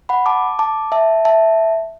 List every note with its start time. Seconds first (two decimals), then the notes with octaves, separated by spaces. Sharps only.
0.09 F#5 B5
0.26 A5 D6
0.59 A5 D6
0.92 E5 A5
1.25 E5 A5